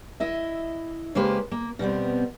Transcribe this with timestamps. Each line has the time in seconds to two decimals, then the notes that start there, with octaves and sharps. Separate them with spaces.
0.20 E4 D#5 E5
1.15 C#3 G#3 A#3 G4 B4 C5
1.51 A#3
1.79 B2 G3 B3 C4